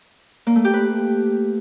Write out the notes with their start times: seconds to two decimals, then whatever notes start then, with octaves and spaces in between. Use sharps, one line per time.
0.47 A#3
0.56 A3
0.65 G4
0.73 B4